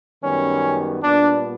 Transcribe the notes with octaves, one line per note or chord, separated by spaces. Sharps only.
F#2 D#3 G3 B3 C#4
A#2 G3 B3 D4